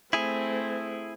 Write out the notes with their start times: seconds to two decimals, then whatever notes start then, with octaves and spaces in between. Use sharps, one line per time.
0.13 A3 C4 E4 G#4